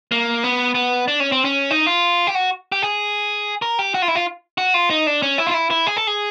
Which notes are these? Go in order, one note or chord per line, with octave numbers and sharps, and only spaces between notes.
A#3
B3
B3
D4
C#4
C4
C#4
D#4
F4
G4
F#4
G4
G#4
A#4
G4
F#4
F4
E4
F4
F#4
F4
D#4
D4
C#4
E4
F4
E4
E4
G#4
A4
G#4